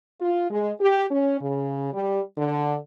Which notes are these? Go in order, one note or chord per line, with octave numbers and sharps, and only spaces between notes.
F4
G#3
G4
C#4
C#3
G3
D3